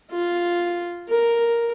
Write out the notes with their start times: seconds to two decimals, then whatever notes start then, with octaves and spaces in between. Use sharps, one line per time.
0.10 F4
1.09 A#4